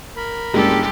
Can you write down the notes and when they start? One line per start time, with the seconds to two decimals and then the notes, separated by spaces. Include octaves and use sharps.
0.17 A#4 B5
0.54 F#1 G2 G3 G#3 G4 A4